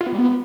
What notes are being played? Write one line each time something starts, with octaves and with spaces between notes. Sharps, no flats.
F4
B3
G3
B3